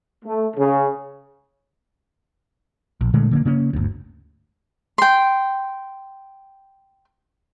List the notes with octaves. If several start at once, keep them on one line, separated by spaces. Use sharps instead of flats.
A3
C#3
A#1
A#2 D3 G#3 A3
D3 A3 A#3
C#3 A#3 C#4
G1 D2
G5 C6